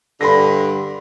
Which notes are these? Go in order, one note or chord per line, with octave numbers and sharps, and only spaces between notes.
G2 D3 B5 C6 A#6